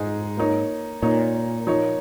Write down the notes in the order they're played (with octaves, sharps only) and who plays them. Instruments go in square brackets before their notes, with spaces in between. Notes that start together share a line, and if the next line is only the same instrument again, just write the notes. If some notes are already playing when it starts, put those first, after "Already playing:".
Already playing: [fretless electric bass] G#2 [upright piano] G#3 D#4 G#4 D#5
[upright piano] A#3 D#4 C#5
[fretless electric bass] A#2 [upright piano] A#3 D#4 C#5
[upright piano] F3 A#3 D#4 C#5